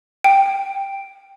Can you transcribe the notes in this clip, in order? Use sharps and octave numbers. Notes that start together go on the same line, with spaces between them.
G5